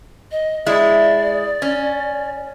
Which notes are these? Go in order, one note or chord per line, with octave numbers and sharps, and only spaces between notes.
D#5
G#3 E4 D5
C#4